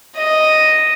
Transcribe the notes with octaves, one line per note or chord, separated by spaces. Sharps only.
D#5